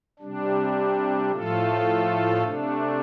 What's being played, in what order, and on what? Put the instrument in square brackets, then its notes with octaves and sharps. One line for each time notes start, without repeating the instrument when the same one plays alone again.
[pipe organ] C3 G3 D4
A2 F3 A3 F4 A4
C3 A3 D4